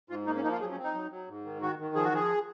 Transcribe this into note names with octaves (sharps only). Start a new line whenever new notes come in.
G#2 F4
A#3 D#4
C#4
F3 D#4
F4
F#3 G#4
C#4
C4
D#4
F#3
F#3
G#2
D#3
D#3 F#4
D#3
F3 G#4
F#4
F3 G#4